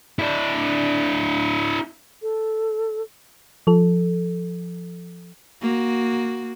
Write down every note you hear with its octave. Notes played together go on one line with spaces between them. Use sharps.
D4 E4
A4
F3 A4
A#3 F#4